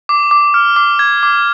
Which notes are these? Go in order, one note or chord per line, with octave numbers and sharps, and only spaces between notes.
D6
D6
F6
D6
G#6
D6